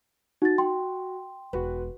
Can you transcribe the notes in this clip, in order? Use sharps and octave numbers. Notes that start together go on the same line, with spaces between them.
D#4 F#4 A6
G5 C6
E1 F#4 B4